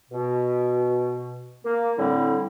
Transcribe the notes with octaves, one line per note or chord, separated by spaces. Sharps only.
B2
A#3
A2 D3 G3 C4 E4